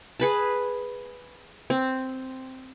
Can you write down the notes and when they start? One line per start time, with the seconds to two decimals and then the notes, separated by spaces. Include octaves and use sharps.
0.20 G#4 B4 A5
1.70 C4